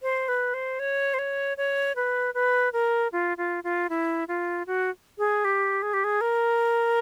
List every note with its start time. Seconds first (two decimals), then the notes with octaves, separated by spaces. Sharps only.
0.02 C5
0.28 B4
0.54 C5
0.79 C#5
1.14 C5
1.19 C#5
1.58 C#5
1.96 B4
2.34 B4
2.73 A#4
3.12 F4
3.38 F4
3.64 F4
3.90 E4
4.28 F4
4.67 F#4
5.18 G#4
5.45 G4
5.82 G#4
5.94 G4
6.04 G#4
6.21 A#4